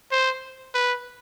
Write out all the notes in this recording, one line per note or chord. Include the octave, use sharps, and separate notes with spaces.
C5
B4